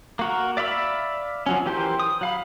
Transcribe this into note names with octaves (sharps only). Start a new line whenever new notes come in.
A#3 F#4 A#4
D5 E5 F5 B5 E6
F3 F#3 C#4
E3 G4 A#4 C5
D#6
F#3 F5 B5